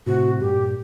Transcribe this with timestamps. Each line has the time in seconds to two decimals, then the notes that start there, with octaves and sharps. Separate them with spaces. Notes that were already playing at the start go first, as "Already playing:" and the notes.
0.06 A2 C3 F#4
0.40 G2 A#2 G4